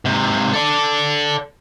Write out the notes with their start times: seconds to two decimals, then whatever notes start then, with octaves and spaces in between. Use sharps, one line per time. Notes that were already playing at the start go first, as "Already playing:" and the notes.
0.05 G#2 C3
0.53 A4 D5